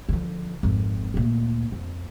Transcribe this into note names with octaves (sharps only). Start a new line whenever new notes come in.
D3 F3
G#1 F2
D2 A#2
F2